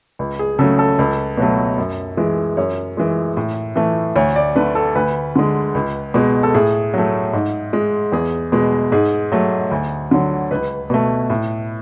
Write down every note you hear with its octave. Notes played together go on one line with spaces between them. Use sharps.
C#2
G#4
C#3 F#3 A3 A4
A4
C#2
B2 F#3 A3
F#2
E3 G#3
F#2 C#5
E3 G#3
A2
E3 A3
D2 C#5
D5
D3 A3 B4
A4
D2 B4
D3 G#3
C#2
B2 G#3
A4
A2 G#4
F#3 A3
G#2
G#3
E2 G#4
B2 G#3
G#2 G#4
F#3 A3
D2
D3 F#3
C#2 B4
B2 A3
A2